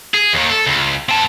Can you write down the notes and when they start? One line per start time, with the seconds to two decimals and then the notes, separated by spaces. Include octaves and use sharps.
0.14 G#4
0.33 D#2 D#3
0.50 A4
0.67 C#2
1.09 C4 A5